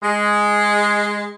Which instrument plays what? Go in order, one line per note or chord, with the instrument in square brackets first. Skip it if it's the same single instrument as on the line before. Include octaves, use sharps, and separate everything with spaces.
[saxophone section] G#3